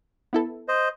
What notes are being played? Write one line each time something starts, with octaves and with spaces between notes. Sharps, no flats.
B3 E4 A4
C5 D#5